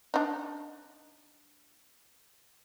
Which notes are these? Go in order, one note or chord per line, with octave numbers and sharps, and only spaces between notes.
D4 D#4